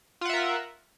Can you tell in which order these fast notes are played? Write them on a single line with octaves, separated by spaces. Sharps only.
F4 F#5 E5 A#4